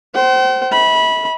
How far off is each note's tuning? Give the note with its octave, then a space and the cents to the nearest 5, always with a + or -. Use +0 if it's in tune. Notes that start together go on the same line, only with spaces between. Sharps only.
C5 +0 G5 -45
E5 -45 B5 -20